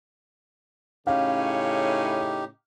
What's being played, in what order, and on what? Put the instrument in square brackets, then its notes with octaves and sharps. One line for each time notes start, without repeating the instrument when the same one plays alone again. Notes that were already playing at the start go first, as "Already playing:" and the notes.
[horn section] A2 C#3 C#4 [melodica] D#4 G4 [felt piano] F5